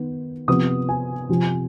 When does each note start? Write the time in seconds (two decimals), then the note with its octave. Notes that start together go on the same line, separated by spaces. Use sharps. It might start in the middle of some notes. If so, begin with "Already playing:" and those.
Already playing: D#3 B3
0.48 C3 F3 B3 D#6
0.89 G#5
1.29 C3 F3 C4